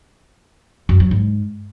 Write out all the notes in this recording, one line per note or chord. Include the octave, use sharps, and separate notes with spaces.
F#2
F#3
G#2